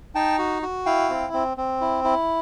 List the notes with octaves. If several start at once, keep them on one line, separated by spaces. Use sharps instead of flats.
D#4 G5 A5
F#4
F#4
E4 F5 G5
C4
C4
C4
E4
E4